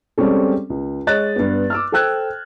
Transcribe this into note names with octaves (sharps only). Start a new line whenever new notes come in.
G3 G#3 C4 C#4 A4
C#2
G#3 C#5 D#5 F#6 A6
G2 B3
D6 E6 F6
A4 C5 G5 E6 F#6 G#6